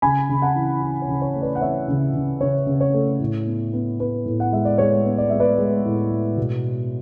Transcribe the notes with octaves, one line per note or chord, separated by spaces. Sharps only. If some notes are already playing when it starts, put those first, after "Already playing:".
C#3 G#5 B5
C#3
F#5 A5
E3
E4
C#5
C#3
C#5
A3
B4 D5
F#5
E3 C#5 E5
C#3
C#3
C#3 C#5
C#3
C#5
A3
A2
B3
B3
B3 B4
A2
F#5
G#3 E5
D5
G#3 C#5
B3
D5
G#3 E5
B4 D5
G#3
A2
G#3
B2